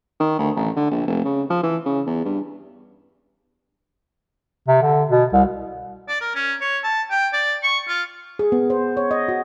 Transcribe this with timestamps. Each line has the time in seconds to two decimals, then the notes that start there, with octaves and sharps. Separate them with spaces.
0.20 D#3
0.39 D2
0.56 A1
0.76 D3
0.91 A#1
1.07 F1
1.25 C#3
1.50 F3
1.63 E3
1.85 C#3
2.06 E2
2.25 G2
4.68 C3
4.82 D3
5.09 B2
5.33 C2
6.08 D5
6.21 A#4
6.35 C#4
6.61 C#5
6.84 A5
7.10 G5
7.33 D5
7.63 C#6
7.88 F4
8.39 G#4
8.52 B3
8.70 C5
8.97 C#5
9.11 D#5
9.28 F#4